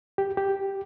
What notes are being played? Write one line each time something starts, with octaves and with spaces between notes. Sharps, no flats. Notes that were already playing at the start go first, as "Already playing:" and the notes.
G4
G4